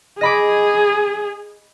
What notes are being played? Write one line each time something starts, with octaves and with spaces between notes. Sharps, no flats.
G#4 D#5 B5 D6